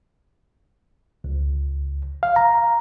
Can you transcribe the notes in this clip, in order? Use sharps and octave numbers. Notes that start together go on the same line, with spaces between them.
C#2
F5
A#5